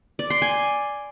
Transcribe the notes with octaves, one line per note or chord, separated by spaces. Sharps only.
D5
C6
G#5